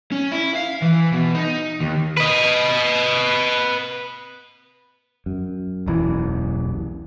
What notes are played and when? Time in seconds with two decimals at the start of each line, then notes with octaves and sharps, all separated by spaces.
0.12 C#4
0.32 E4
0.56 F5
0.82 E3
1.13 B2
1.35 D#4
1.81 D#2
2.17 B4 D#5
5.26 F#2
5.86 E1 B1 E3